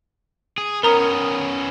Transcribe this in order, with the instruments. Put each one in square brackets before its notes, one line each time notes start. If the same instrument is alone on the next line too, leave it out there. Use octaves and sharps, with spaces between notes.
[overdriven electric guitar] G#4
[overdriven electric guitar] B3 C#4 [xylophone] A#4 A#5 D#6